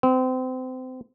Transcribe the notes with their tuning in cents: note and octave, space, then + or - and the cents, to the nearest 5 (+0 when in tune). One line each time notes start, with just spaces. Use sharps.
C4 -30